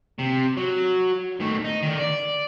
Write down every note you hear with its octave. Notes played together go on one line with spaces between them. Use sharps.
C3
F#3
D#3 A3
D#4
D3 D#3
D5